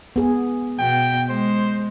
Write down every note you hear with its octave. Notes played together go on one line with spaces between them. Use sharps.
B3 G#4
B2 G5
G#3 C5